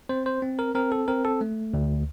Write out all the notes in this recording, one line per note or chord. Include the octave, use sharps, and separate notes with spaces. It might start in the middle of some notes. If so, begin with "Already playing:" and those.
C4 C5
C5
C4
A#4
C4 A#4
A4
C4 A#4
A4
A3
D2